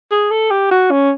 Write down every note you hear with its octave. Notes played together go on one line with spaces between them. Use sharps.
G#4
A4
G4
F#4
C#4